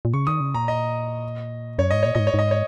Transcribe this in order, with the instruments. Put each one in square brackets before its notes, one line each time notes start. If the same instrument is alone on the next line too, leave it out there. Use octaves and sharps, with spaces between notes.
[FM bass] A#2
[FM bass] C#3 [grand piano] C#6
[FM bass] D#3 [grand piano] D#6
[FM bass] C#3
[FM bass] A#2 [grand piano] A#5
[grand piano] D#5
[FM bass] F#2 [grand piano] C#5
[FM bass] G#2 [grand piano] D#5
[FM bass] A#2 [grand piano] C#5
[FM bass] A#2 [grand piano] D#5
[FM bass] G#2
[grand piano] C#5
[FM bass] G#2 [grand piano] D#5
[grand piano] C#5